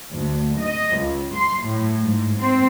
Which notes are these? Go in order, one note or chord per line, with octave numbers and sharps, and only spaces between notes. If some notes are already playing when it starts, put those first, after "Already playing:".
D2
D#5
C#2
C6
A2
G#2
C4